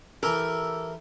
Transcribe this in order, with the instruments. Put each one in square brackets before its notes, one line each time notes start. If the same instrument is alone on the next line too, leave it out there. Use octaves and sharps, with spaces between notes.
[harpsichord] E3 G4 A4 [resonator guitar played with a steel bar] A#4